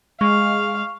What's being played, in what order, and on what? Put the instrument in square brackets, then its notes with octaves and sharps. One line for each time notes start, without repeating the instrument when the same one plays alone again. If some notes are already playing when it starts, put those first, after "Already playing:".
[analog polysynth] G#3 [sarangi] F5 [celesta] C#6